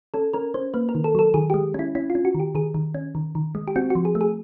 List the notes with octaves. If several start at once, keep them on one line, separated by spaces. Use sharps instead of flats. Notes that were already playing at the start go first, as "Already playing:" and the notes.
C#4 A4
C#4 A#4
C#4 C5
A#3 B4
A#4
D#3
A4
F#3 A4
D#3 G#4
G4
G#3
C#4 E4
C#4 E4
F4
C#4
F#4
D#3
G4
D#3 G#4
D#3
C#4
D#3
D#3
G#3
G4
C4 F#4
F#4
F3
G#4
A3
G#4